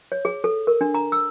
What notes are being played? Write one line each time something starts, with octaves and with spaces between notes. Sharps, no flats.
C#5
G#4
A4
A#4
D4
A#5
E6